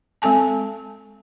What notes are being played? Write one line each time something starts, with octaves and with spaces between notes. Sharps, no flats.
G#3 C4 A4 G#5 A5